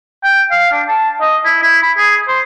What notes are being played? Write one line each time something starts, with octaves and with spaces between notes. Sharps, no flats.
G5
F5
D4
A5
D#5
E4
E4
B5
G#4
C5